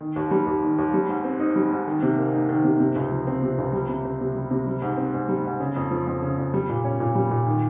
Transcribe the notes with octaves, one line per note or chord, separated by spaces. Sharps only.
D#3
D#2
G3
D#2
D#3
D#2
G3
G#2
C4
D#4
G3
G#2
D#3
C3
A#3
D#4
D#3
C3
C3
C#2
F3
C4
C3
C#2
G3
C3
C4
C3
G3
C3
G3
G#2
C4
G#2
G3
G#2
C#3
F2
F3
F2
C#3
F2
G3
A#2
C#4
A#2
G3
A#2
D#3